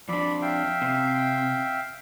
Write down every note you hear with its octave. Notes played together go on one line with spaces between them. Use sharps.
F2 D4 D5 B5
E5 F5 G5
C3